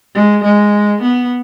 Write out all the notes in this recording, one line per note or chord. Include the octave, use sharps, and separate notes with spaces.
G#3
G#3
B3